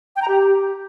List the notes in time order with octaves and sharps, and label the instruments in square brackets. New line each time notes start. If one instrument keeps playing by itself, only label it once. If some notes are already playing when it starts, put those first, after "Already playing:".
[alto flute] G5
A#5
G4